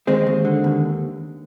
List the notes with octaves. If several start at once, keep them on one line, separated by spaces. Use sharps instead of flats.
D#2 G#3 C4
D#2
D3
D#2